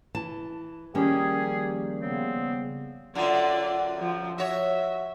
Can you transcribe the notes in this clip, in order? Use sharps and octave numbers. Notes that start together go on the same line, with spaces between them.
E3 A5
D#3 F3 G3 A#3 C#4 G4 G#4
C#3 B3 C4
F#2 D3 F4 D5
F3
F#4 C#5 E5